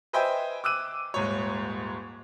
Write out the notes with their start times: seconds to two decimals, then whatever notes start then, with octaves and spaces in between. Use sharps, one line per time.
0.13 B4 C5 D#5 E5 G5 G#5
0.64 D6 E6 F#6 D#7
1.14 D#1 G#2 C#5